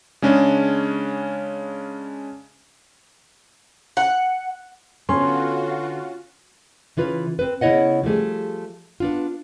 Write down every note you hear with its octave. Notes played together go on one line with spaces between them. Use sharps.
C#3 G#3 C#4 D4
F#5
D3 B3 C#4 F4 F#4 A4 C6
C#3 E3 F4 B4
C4 B4
C#3 B3 E4 C#5 D#5 F#5
F3 G3 A3 G#4
B3 D4 F4